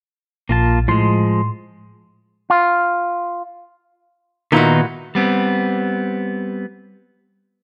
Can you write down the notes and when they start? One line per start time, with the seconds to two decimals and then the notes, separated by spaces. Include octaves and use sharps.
0.49 A#1 A#3 F4 A5
0.88 A2 F3 G#3 C6
2.50 F4
4.52 A#2 D#3 B3 D#4 E4 F#4
5.15 G3 B3 C4